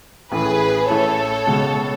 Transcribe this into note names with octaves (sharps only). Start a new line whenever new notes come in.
A1 A2 E3 G#4 B4
A1 A2 E3 A4 C#5
C#2 B2 G#3